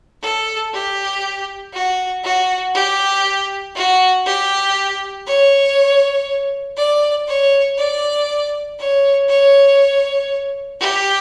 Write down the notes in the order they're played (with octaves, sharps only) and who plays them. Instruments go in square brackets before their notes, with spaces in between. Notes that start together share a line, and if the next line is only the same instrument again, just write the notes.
[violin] A4
G4
F#4
F#4
G4
F#4
G4
C#5
D5
C#5
D5
C#5
C#5
G4